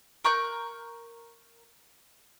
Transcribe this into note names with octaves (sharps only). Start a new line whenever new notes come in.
A#4 C#6 F#6 G6